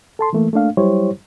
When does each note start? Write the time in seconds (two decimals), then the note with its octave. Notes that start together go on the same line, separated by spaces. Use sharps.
0.19 A4 A5 C6
0.33 E3 A3 A#3
0.53 A3 A#3 D4 F5
0.77 F#3 G3 E4 G4 C5 C#5